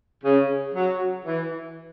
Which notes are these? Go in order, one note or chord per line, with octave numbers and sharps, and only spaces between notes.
C#3
F#3
E3